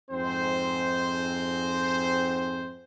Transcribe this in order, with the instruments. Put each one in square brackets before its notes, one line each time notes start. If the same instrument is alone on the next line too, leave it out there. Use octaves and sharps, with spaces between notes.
[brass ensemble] F2 G#2 C4 C5